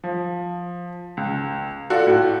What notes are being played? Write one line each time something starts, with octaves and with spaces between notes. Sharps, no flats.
F3
C#2
F4 F#4 A4 D5 F#5
A2 F#4